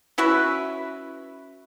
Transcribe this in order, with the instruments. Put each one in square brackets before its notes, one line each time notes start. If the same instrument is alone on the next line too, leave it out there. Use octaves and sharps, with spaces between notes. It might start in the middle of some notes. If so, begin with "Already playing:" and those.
[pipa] C#4 E4 F#4 B4